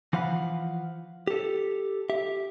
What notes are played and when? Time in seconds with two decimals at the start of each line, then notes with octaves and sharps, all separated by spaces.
0.13 E3 F3 F5 F#5 B5
1.27 G4 A4
2.10 G4 E5